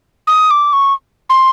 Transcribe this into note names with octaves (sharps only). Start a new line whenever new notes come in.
D#6
D6
C#6
C6